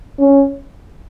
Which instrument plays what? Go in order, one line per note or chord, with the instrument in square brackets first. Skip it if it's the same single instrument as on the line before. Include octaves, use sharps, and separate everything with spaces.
[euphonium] C#4